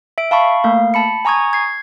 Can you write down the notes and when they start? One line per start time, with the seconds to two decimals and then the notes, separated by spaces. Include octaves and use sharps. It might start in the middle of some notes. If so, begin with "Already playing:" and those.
0.18 E5 D7
0.31 F5 A5 B5 C#6
0.64 A3 A#3 F5
0.94 A5 B5 C#7
1.25 G#5 A#5 C#6 D#6 G#6
1.53 G#6 C7